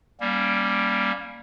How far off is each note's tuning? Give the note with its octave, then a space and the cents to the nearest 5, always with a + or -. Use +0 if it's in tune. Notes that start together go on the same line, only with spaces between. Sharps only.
G3 +0 A#3 +15 C#4 +0